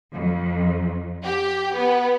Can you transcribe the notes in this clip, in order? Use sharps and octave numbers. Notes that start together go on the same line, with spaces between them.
F2
G4
B3